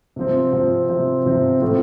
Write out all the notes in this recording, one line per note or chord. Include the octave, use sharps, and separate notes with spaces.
C3 F3 C4
C3 F3 C4
C3 F3 C4
C3 F3 C4
A2 F3 A3 C4 F4